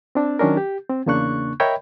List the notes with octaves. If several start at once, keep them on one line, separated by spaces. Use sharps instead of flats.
C4 D4
D#3 F#3 C#4 D4 A#4
G4
C4
E2 C#3 A#3 D4 C#6 F#6
A#4 C#5 D#5 E5 G5 B5